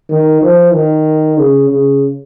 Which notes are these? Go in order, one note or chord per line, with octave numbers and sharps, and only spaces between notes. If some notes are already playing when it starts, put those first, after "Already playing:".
D#3
F3
D#3
C#3
C#3